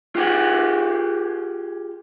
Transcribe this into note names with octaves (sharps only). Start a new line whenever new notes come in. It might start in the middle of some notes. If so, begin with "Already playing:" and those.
F4 G4 G#4 F#5